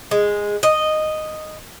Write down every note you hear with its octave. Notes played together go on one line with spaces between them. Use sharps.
G#3
D#5